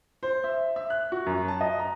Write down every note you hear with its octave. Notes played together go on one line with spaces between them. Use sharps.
C5
E5
E5
F#6
F#4
F#2
A5
D#5
A#5